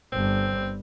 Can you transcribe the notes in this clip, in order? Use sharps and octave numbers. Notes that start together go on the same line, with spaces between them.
G1 G3 C4